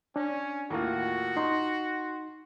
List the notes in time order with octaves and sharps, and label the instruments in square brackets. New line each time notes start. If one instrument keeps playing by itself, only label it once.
[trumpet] C#4 [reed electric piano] D4
[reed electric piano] D#2 [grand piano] A2 A#3 F4 [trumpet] F#4
[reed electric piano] D#4 [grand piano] C6